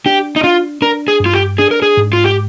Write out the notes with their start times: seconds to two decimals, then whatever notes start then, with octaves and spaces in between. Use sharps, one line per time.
0.06 D4 G4
0.36 D#4
0.44 D4 F4
0.82 D4 A#4
1.08 G#4
1.20 G2
1.26 F4
1.33 G4
1.58 D4 G#4
1.71 A#4
1.82 G#4
1.97 G#2
2.13 F4
2.24 G4